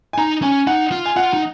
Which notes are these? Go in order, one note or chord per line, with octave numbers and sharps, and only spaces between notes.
G#5
D#4 A#5
C#4 G#5
D#4 F#5
F4
G#5
F4 F#5
D#4